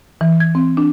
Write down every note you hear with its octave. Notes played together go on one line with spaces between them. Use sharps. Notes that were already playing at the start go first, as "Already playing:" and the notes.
E3
G#6
C4
D4